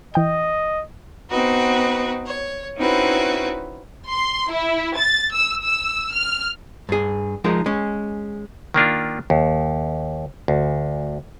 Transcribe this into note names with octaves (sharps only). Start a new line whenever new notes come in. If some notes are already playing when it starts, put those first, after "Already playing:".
E3 D#5 G5 G6
B3 C4 D#4 F#4 B4
C#5
C4 C#4 D#4 E4 F#4 B4
C6
E4
A6
E6
E6
F6
G2 G#4
F3 G#3 D#4 A#4
G#3 C#4
D#3 A#3 D4 F4
D#2
D2